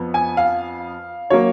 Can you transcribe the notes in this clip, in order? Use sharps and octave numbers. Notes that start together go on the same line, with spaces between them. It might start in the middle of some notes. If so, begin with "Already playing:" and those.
Already playing: F2 F3 B3
G#5
F5
F#3 A#3 C#5